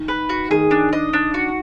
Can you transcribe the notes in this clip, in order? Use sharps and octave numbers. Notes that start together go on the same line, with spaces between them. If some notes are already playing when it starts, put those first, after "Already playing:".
Already playing: D#3
B4
F#4
D#3 G#4
D4
D#5
D4
F#4